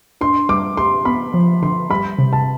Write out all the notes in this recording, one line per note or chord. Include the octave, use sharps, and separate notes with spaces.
D4 C6
G3 D6
G4 C6
B3 B5
F3
D3 C6
G3 B5
C3
A5